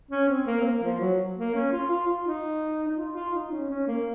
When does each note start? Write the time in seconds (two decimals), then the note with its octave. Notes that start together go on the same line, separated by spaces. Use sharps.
0.11 C#4
0.29 C4
0.46 A#3
0.61 C4
0.65 A#3
0.83 F3
1.01 F#3
1.37 A#3
1.55 C#4
1.72 F4
1.91 F4
2.08 F4
2.27 D#4
2.88 D#4
2.97 F4
3.16 F4
3.34 D#4
3.51 C#4
3.69 C#4
3.88 A#3